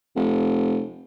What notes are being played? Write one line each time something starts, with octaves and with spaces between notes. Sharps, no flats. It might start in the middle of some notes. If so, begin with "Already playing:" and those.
F1